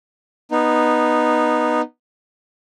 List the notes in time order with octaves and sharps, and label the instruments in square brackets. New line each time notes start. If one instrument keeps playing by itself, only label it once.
[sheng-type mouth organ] B3 D#4